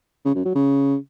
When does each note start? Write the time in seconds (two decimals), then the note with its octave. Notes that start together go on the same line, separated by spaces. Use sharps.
0.25 C#3
0.35 F#2
0.45 F#3
0.55 C#3